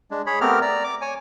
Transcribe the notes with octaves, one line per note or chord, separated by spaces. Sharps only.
G#3 D4
G#4 C#5 B5
A3 B3 C4 G4 A#4 F6
D5 A#5
D6
C#5 G#5